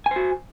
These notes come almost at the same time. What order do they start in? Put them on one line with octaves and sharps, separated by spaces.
G#5 C5 F#4